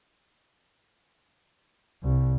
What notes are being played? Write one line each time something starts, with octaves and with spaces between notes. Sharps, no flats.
C2